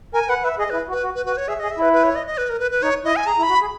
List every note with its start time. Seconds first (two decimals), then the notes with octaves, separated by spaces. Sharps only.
0.13 A#4 G#5
0.29 B4 F#5
0.43 B4 E5
0.58 G#4 D#5
0.70 E4 B4
0.89 F#4
0.92 B4
1.03 F#4
1.15 B4
1.26 F#4 B4
1.37 C#5
1.48 G#4 E5
1.60 G#4 D#5
1.71 E5
1.78 E4 B4
1.93 B4
2.04 C#5
2.15 D#5
2.27 D#5
2.38 B4
2.49 A#4
2.60 B4
2.71 B4
2.83 D#4 C#5
3.04 E4 D#5
3.16 G#5
3.27 G#4 A#5
3.38 E4
3.43 B5
3.49 F#4
3.61 G#4